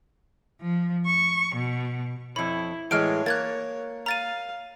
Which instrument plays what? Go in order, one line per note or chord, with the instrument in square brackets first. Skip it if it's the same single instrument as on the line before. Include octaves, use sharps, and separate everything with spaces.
[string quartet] F3
C#6
B2
[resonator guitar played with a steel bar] F2 C#5 [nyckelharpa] E4 [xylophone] B5
[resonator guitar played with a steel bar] A2 E3 G#3 [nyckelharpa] C#5 [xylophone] F6 D7
[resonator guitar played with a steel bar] A#3 [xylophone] F#6 G#6 A6
[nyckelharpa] F5 [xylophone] A#5 A6 D#7